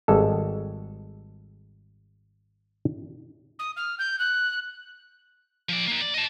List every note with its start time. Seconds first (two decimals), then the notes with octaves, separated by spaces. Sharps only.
0.08 G#1 G3 G#3 A4
3.59 D#6
3.77 F6
3.99 G6
4.19 F#6
5.69 F3 D5
5.87 A#3 D#4
6.01 D5
6.14 D#5 A5